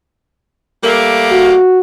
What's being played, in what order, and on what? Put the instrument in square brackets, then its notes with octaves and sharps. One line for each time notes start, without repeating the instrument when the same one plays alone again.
[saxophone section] G3 A3 A#3
[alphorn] F#4